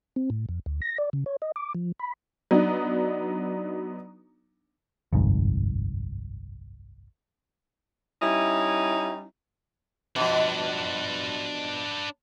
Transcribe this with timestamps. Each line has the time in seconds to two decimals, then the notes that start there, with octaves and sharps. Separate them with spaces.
0.16 C4
0.30 A2
0.49 F2
0.66 D2
0.82 A#6
0.98 D5
1.13 C#3
1.26 C#5
1.42 D#5
1.56 D6
1.74 F3
2.00 B5
2.51 F#3 B3 D4 D#4
5.13 G1 C2 F2 G#2
8.22 G3 C#4 D#4 E4
10.16 B2 F3 D4 B4